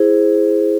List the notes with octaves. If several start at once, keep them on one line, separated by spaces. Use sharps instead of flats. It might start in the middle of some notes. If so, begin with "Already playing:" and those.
Already playing: E4 G#4 C5